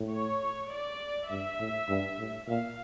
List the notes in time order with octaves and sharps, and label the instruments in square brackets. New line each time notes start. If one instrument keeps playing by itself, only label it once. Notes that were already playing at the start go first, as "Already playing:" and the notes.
Already playing: [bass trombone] A2
[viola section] C#5
D5
[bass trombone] G2 [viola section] E5
[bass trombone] A2
G2
A2
[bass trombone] A#2 [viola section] F5